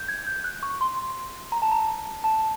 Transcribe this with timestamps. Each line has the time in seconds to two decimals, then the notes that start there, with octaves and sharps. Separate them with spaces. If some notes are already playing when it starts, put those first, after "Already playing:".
Already playing: G6
0.08 G#6
0.27 G6
0.44 F#6
0.63 C#6
0.81 C6
1.52 A#5
1.62 A5
1.71 A#5
2.24 A5